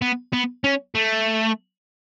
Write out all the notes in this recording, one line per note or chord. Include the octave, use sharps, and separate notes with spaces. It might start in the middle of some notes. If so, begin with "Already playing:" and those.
B3
B3
C#4
A3